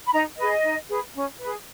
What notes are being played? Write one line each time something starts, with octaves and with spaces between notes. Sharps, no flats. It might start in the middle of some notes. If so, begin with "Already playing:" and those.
B5
D#4 A#5
G#4 B4 D#5
D#4
G#4 B4
C#4
G#4 B4